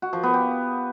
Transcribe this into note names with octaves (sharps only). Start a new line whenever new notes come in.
F#4
F3
B3
G4